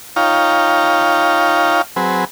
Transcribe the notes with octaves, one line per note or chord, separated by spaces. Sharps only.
D#4 F4 C#5 F5 G5 A#5
F#3 C4 G#4 B4